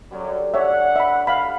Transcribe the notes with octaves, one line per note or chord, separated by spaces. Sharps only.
F#2 D3 F#3 G3
G2 D4 C#5 D5 E5 F#5
E5 B5
F5 F#5 B5